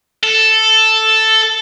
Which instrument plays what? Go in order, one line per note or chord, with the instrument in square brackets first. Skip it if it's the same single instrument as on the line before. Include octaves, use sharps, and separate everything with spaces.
[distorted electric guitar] A4